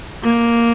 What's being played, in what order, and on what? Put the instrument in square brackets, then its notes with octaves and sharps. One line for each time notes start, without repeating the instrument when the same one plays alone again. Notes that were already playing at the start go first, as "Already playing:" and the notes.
[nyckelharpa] A#3